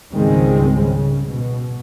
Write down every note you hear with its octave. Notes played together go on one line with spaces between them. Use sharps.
C#2 G#2 D#3 G3 G#3 C4
C#3
B2